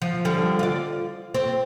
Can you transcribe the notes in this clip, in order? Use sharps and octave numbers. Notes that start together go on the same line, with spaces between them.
F3
D3 F3 G3
F4 D5
C4